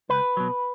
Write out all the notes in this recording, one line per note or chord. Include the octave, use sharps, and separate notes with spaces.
C#2 B4
B2 F#3